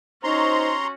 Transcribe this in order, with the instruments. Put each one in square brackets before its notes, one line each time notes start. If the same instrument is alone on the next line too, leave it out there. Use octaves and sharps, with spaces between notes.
[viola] C#4 F#4 [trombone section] D#4 C5 [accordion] A#5 C6